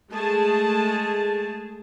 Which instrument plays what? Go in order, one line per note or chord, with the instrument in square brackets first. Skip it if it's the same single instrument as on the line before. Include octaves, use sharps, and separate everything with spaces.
[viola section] G#3 A3 G#4 A5